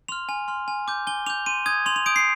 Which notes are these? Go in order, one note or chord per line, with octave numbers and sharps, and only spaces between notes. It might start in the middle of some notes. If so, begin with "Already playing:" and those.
C6 F6 F7
G#5
C6 F6
G#5
D6 G6
G#5 G7
D6 G6 F7
C6 D#7
D#6 G6 G#6
C6 F7
F7
D#6 G6 D7
C7